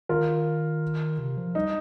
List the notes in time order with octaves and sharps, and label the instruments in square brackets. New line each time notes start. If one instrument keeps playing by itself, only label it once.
[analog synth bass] D#3 [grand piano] F4 A#4
[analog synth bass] C3
F3
[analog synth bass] G3 [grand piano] D#4